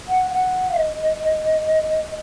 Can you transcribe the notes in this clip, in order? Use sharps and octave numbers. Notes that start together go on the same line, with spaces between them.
F#5
F#5
D#5